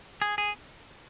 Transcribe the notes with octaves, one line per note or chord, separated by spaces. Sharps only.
G#4
G#4